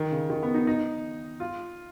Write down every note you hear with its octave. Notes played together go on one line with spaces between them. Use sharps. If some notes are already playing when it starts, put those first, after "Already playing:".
Already playing: D#3
C#3
D#3
B3
D#4
D#4
F4